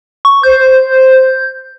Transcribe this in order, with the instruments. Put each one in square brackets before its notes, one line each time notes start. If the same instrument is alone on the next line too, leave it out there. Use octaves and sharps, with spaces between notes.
[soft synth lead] C#6
[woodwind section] C5 [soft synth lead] G6